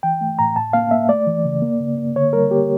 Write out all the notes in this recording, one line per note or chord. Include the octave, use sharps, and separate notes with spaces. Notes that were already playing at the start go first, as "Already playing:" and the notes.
E3 G5
A3
A2 A#5
A2 A5
A#3 F5
A#3 E5
A3 D5
E3
C#3
A#3
C#3
A#3
D3 C#5
G3 A#4
A#3 G4